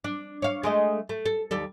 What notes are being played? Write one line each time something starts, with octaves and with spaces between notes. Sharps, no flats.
D4
C#5 F5
G#3 A3 D#5
A3
A4
D#2 G3 A4